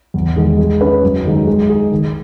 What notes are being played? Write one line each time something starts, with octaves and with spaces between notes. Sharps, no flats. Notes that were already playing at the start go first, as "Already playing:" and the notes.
E2
D#3 G#3
G#3
C#4 G#4 B4
F#2
D#3 G#3 D#4
G#3
D#4 G#4
D#3